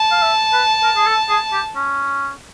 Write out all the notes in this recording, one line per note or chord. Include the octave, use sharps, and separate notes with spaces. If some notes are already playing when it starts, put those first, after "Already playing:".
Already playing: A5
F5
E5
B4
A#4
G#4
A4
G#4
G4
C#4